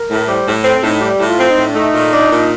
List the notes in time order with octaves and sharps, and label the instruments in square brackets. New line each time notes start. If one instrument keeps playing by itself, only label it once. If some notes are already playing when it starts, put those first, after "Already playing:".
Already playing: [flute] A#4
[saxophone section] A2
[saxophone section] G3 [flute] C5
[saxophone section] A2
[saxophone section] C4 [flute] A4
[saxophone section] A2 [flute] D#4
[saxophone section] G3 [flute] G4
[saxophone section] A2
[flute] F4
[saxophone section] C4
[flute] D#4
[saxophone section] A2
[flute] D4
[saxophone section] A3 [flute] D#4
[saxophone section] A#2
D4
A#2